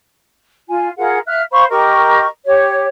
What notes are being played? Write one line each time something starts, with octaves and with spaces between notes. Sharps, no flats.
F4 G#5
F4 G#4 A#4 F#5
E5 F5 F6 F#6
C5 F5 B5 C#6
G4 A#4 D#5 C#6
G4 C#5